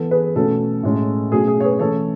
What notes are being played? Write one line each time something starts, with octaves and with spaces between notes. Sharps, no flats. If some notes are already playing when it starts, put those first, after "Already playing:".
Already playing: E3 B3 A4
G#4 B4
B2 A3 C#4 A4
A2 G#3 C#4
B2 F#3 A3 C#4 G#4
G#4
C#5
G#4 B4
E3 A3 C#4 A4 C#5